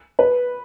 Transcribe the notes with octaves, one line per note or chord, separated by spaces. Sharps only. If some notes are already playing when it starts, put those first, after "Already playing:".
B4